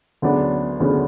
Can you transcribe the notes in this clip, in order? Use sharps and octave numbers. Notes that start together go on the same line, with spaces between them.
D2 C#3 F#3 B3 D4
D2 C#3 F#3 B3 D4